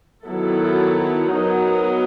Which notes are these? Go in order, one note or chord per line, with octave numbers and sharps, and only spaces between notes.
D#3 F#3 B3 E4 A4
F#3 B3 D#4 F#4 A#4